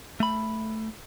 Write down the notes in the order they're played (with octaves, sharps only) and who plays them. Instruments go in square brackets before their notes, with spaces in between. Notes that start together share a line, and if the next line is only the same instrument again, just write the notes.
[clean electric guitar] A3 B5